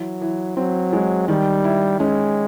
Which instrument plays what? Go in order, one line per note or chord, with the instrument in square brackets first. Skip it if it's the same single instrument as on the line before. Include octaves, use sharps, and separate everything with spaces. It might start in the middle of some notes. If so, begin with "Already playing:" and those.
Already playing: [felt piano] E3 [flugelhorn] F#3
[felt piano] E3
[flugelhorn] F#3 [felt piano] C4
[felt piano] G#3
[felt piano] D#3 [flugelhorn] G3
[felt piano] E4
[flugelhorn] G#3 [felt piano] C#4